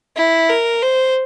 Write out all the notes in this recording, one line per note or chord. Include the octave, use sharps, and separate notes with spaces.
E4
A#4
C5